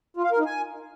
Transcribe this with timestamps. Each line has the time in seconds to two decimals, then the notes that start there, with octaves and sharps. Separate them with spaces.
0.17 F4
0.24 F5
0.31 A#4
0.39 D#4
0.46 G#5